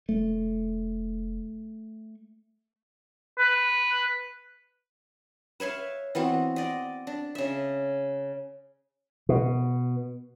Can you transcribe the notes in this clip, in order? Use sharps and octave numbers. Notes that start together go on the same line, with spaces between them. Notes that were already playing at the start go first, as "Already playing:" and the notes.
E1 A3
B4
B4 C#5 E5 F5
E3 B3 C4 F#4
D5 D#5
D4
C#3 E5
B2